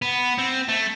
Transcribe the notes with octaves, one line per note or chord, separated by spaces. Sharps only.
B3
C4
A3